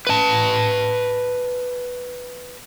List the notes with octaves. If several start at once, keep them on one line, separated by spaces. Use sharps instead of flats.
B4 A5